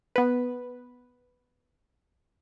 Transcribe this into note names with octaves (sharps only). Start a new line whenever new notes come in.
B3 B4